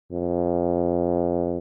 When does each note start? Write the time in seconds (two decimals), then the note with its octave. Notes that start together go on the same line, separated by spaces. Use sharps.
0.12 F2